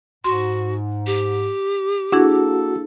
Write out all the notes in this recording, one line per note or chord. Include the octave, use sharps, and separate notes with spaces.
G#2 F#4 C6
G4
A#3 D4 E4 F#4 G#4 A4